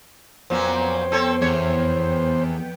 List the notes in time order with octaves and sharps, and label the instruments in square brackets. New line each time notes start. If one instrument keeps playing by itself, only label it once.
[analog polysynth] F2 B3 G5 [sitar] A#2 F#3 C#4 [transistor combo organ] C5
[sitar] C4 A4 C#5
[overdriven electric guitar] E2 [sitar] C#5